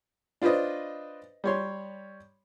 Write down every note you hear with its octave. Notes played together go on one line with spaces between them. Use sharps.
D4 F4 B4 C5 D#5
G3 C#5 C6